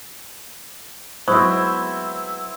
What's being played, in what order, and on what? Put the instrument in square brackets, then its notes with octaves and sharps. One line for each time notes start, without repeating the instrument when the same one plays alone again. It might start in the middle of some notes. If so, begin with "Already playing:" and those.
[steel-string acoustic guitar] F#3 G#3 B3 [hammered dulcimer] C4 E4 [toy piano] C5 C#6 D#6